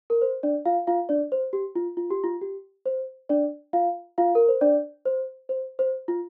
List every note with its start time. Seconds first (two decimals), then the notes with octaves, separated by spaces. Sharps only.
0.10 A#4
0.22 C5
0.43 D4 D5
0.66 F4 F5
0.87 F4 F5
1.09 D4 D5
1.32 C5
1.53 G4
1.76 F4
1.97 F4
2.11 G4
2.24 F4
2.41 G4
2.85 C5
3.29 D4 D5
3.73 F4 F5
4.18 F4 F5
4.35 A#4
4.49 C5
4.61 D4 D5
5.05 C5
5.49 C5
5.79 C5
6.08 F4